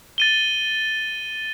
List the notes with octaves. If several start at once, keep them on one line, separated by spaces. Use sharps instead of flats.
A6 D#7 G7